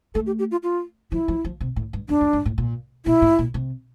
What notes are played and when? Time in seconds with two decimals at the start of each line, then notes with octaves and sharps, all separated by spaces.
0.14 A3 A4
0.27 G4
0.39 G4
0.51 F4
0.63 F4
1.12 F3 E4
1.28 F3
1.45 F3
1.61 C3
1.76 A2
1.93 G2
2.09 E2 D4
2.21 F2
2.33 G2
2.45 A2
2.58 A#2
3.05 A#2 E4
3.22 A2
3.39 A#2
3.54 C3